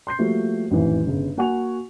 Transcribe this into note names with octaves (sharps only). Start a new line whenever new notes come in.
C6 G6 C7
F3 G3 A3 A#3 F#4
A1 F2 D#3 E3
G1 C#3
A#3 F#4 F#5 G#5 C#6 F7